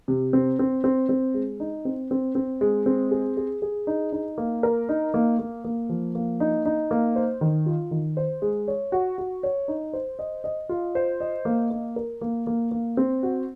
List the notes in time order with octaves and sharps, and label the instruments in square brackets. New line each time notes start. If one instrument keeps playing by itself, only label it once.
[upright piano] C3
C4
C4
C4
C4
G#3
D#4
C4
C4
C4
G#3
C4
G#4
G#4
G#4
D#4
D#4
A#3
A#4
D#4
A#3
A#3
A#3
F3
A#3
D#4
D#4
A#3
C5
D#3
F4
D#3
C5
G#3
C#5
F#4
F#4
C#5
D#4
C5
D#5
D#5
F4
C5
D#5
A#3
A#3
A#4
A#3
A#3
A#3
C4
F#4